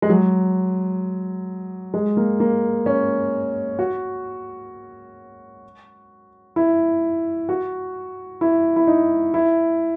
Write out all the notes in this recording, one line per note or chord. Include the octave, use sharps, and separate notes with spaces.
G#3
F#3
G#3
A#3
A#3
C#4
F#4
E4
F#4
E4
E4
D#4
E4